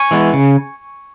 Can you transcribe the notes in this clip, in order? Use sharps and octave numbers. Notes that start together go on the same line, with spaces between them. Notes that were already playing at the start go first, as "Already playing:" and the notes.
Already playing: G#5 C#6
E3 G#3 B3
C#3